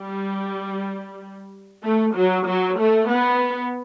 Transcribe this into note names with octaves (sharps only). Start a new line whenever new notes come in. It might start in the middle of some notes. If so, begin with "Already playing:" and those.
Already playing: G3
A3
F#3
F#3
A3
B3